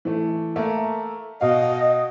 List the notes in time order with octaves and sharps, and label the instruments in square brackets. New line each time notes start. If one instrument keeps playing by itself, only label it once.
[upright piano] E3 A3
A3 A#3 E5
[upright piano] B2 F5 [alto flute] D#5